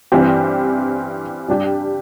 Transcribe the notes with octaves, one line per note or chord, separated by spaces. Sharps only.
G2 E3 C4 G4
G2 G3 D4 G4